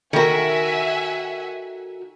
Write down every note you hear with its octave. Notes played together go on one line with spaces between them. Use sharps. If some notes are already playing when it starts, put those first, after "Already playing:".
D#3 F#4 A4 A#4 E5 F#5 G#5